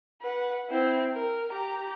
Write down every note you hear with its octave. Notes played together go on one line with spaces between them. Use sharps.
B4 F#5
C4 E4
A#4
G4 A#5